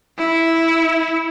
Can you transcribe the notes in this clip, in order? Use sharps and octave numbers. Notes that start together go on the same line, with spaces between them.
E4